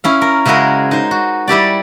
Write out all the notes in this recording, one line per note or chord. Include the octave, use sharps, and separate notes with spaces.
C#4 E4 F5
A#4
C#3 G#3 E4 F#4 G#4 A#4
D#4 C5
F#4
G3 E4 G4 D5